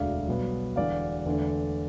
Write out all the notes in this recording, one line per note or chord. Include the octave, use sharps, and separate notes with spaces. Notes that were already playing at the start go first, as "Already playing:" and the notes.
Already playing: E1 D2 D3 D5 F5
B1 B2 G3 B3
E1 E2 D3 D5 F5
E2 D3 A3